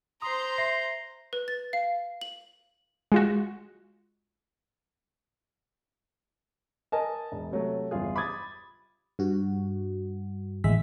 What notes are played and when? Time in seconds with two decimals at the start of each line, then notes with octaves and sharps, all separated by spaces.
0.22 C5 A#5 C6 D#6
0.58 E5 A#6 C7
1.33 B4
1.48 A6
1.73 F5
2.21 F#7
3.12 G#3 F4 F#4
6.92 A#4 D#5 G#5 A5
7.32 E1
7.51 C3 F#3 A3
7.91 G1 E2 C#3 F4 G#4
8.16 B5 D6 D#6 G#6 A6
9.19 G2 F#4
10.64 A1 D#2 G#3 E5 B6